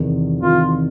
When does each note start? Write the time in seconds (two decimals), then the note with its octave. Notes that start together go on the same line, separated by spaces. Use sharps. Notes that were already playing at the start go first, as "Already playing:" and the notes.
Already playing: E2 C3 D#3
0.41 E2 C3 D#3 F4